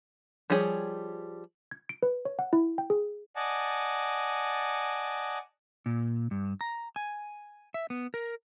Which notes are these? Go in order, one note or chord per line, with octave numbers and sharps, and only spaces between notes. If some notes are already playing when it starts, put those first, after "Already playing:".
F3 G3 G4 G#4 C#5
G#6
D7
B4
C#5
F#5
E4
G5
G#4
D5 D#5 F#5 G#5 A5
A#2
G2
A#5
G#5
E5
B3
A#4